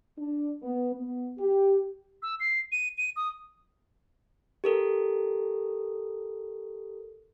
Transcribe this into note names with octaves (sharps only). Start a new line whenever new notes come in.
D4
B3
B3
G4
E6
C7
D#7
D#7
D#6
G4 A4 A#4